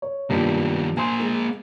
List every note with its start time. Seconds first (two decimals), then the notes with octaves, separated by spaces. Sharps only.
0.02 C#5
0.30 G2 D#3 A#3 B3 F4
0.97 A#3 C5 G#5 C6
1.20 G#3